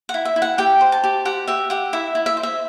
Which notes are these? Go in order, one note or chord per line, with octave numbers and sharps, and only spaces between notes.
F#5
E4
E5
E4
F#5
G4 G5
C5
A5
G4
G4 F#5
G4 E5
G4 F#5
E4 E5
E4
E5
C5
E5